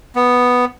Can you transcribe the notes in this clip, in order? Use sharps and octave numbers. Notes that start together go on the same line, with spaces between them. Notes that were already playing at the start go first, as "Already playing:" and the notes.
B3